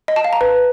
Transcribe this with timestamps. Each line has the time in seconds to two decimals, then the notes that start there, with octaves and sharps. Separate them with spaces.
0.08 D#5
0.16 A5
0.24 F5
0.33 A#5
0.41 B4